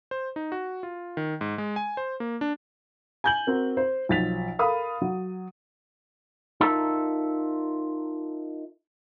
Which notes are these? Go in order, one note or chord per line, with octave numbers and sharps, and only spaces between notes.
C5
D#4
F#4
F4
D#3
G#2
G#3
G#5
C5
A#3
D4
G#5 G6 F#7
C4 F#4 A#4
C5
B1 F3 A6 B6 F7
A4 A#4 F5 B5 D#6
F#3
D#4 F4 A4 A#4 E5